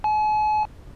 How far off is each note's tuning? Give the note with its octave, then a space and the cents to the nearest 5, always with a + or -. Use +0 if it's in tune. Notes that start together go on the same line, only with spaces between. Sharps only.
G#5 +45